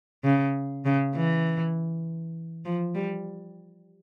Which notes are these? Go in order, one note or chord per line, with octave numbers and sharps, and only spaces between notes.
C#3
C#3
E3
F3
G3